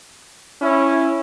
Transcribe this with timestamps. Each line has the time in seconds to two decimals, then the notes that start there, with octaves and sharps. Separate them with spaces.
0.62 C#4 E4